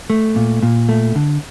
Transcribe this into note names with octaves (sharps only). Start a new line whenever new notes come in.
A3
A#2
A#2
A3
D3